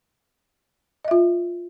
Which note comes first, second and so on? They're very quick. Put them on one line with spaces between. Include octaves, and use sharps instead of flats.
D#5 E5 F4